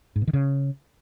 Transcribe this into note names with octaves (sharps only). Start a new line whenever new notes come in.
G#2
B2
D#3
C#3